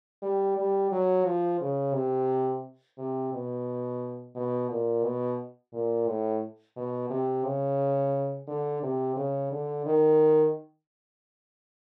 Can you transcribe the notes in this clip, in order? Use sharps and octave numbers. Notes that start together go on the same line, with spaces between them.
G3
G3
F#3
F3
C#3
C3
C3
B2
B2
A#2
B2
A#2
A2
B2
C3
C#3
D3
C3
C#3
D3
D#3